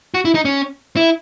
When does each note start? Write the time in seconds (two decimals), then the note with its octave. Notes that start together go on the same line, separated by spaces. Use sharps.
0.14 F#4
0.25 E4
0.35 D#4
0.45 C#4
0.96 E4